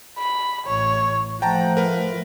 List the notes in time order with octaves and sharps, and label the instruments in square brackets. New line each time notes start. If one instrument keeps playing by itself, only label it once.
[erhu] B5
[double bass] A1 [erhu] C#5
[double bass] F3 A3 [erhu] F#5 [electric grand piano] G5 A5 A#5
[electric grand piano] A#4 B4